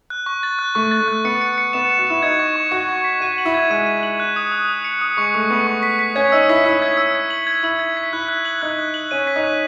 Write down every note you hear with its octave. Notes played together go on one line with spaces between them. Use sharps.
F#6
C#6
A6
F#6
A3 C#6
A6
A3
F#6
B3 C#7
C#7
C#7
B3 E7
E7
F#4
E4 E7
D#4 G#6
C#6
C#6
F#4 C#6
C#6
B6
F#4 D#7
F#7
E4
G#6
G#3 D#7
D#7
F#7
F#6
D#6
D#6
D#6
C#7
D#6
G#3 C#6
A3 C#6
B3 C#6
C#6
B6
B6
C#4 G#6
D#4 E6
E4 B6
E4 B6
G#6
E6
G#6
F#7
G#6
E4 F#7
G#6
B6
E4 F#6
F#6
F#7
D#4 F#6
F#6
F#7
C#4 D#7
B6
D#4
F#6